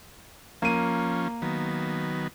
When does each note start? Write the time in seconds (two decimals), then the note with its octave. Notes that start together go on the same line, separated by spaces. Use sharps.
0.62 F3 A#3 C#4 D#7
1.42 D#3 F#3 B3